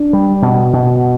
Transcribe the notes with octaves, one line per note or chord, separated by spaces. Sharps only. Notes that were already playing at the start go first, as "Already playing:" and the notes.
Already playing: D4
G3
B2
B2